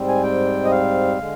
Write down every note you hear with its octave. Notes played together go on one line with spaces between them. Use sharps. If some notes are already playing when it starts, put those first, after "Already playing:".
Already playing: G#2 G3 C4
G#5
G5
D#5
F5
D3 G#3